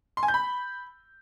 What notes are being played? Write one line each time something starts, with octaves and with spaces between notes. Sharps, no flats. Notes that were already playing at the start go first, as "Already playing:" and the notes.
C6
G#5
G6
B5